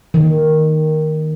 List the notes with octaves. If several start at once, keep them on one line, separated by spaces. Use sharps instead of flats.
D#3